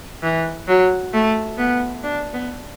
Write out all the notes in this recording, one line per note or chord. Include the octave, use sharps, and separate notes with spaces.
E3
F#3
A3
B3
D4
B3